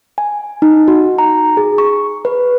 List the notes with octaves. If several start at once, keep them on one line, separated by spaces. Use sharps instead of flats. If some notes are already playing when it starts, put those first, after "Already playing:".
G#5
D#4
F#4
A#5
G#4
C#6
B4